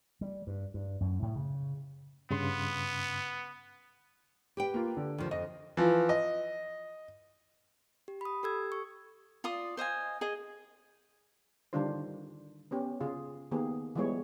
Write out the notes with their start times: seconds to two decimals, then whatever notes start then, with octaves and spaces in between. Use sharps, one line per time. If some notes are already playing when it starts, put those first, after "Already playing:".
0.21 G3
0.47 G2
0.74 G2
1.01 F#2
1.22 A2
1.36 C#3
2.31 G2 C#3 B3 C6
4.57 G4 B4 G5
4.74 A#3 F4
4.97 D3
5.18 D#2 F3
5.31 F2 D#5
5.77 E3 F3
6.09 D#5
8.08 G4
8.21 B5 D#6
8.43 G4 A4 E6 G#6
8.72 C#6
9.44 F4 D5 D#6
9.77 C5 D#5 F5 G#5
10.21 G#4 D#5
11.73 D3 D#3 G3 D4 F4 C5
12.71 B3 C#4 G4
13.00 C#3 F4 G#4
13.51 D#3 A#3 B3 G4 G#4
13.95 E3 F3 G3 G#3 B3 C#5